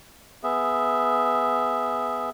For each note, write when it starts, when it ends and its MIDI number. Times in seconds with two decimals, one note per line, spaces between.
0.43 2.30 59
0.43 2.30 68
0.43 2.30 76